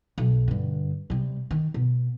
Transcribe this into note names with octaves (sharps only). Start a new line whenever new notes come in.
B1
G2 D3
C3 G3
D#3
B2